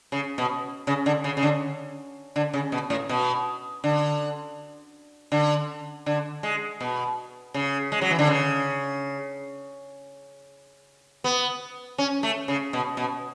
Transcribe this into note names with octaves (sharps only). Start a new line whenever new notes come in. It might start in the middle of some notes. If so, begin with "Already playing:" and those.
C#3
B2
C#3
D3
C#3
C#3
D3
D3
C#3
B2
A2
B2
D3
D3
D3
G#3
B2
C#3
G#3
F#3
E3
D3
C#3
B3
C#4
A3
C#3
B2
B2